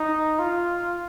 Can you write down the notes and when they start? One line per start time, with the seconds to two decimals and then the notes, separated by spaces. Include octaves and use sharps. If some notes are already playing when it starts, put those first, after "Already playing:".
Already playing: D#4
0.39 F4